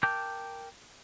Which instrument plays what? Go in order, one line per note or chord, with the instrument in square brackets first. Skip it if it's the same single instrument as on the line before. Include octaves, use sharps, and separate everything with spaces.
[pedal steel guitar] A#4 G5 A5 D6 G6